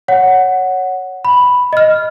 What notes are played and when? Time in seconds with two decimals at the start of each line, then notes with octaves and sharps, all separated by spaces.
0.08 C#5 F#5
1.25 B5
1.73 D#5 F6